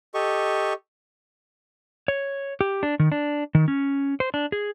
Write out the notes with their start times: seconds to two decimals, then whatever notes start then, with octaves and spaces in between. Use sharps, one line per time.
0.14 G4 A4 D#5 C#6
2.08 C#5
2.61 G4
2.83 D4
2.99 D#3
3.12 D4
3.55 D#3
3.68 C#4
4.20 C5
4.34 D4
4.52 G#4